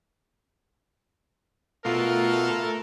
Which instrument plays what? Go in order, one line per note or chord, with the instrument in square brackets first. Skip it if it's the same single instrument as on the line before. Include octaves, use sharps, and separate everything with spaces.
[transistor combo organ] B2 [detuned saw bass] A3 [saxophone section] F4 [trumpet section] A4 A#4